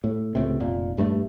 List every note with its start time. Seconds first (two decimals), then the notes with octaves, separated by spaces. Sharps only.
0.04 A2
0.35 C#2 A2 C3
0.60 F1 A#2
0.97 D#1 G2 G#3 A3